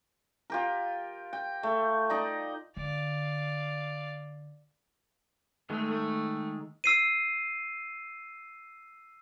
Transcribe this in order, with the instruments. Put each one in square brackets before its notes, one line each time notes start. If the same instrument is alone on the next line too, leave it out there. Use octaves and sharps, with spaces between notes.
[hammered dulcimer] F4 G4 A#4
G5
A3
D#4 D5 D#5 A#5
[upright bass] D3 [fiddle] D5 F5
[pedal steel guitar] D#3 G#3 [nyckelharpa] A3
[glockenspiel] E6 C7 D#7